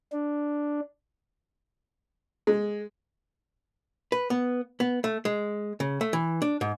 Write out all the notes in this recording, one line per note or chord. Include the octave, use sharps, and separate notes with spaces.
D4
G#3
B4
B3
B3
A3
G#3
C#3
A3
E3
D4
G#2